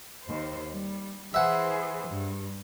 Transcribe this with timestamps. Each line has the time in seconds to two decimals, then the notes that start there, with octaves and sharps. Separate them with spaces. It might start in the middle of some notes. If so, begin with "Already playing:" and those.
0.24 D#2 C5
0.70 G3
1.34 E3 G#4 C5 E5 F#5
2.09 G2